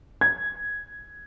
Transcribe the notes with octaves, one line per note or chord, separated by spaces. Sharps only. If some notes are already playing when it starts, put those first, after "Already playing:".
G#6